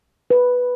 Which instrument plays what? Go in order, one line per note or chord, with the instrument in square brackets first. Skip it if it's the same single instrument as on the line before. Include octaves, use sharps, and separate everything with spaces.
[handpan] B4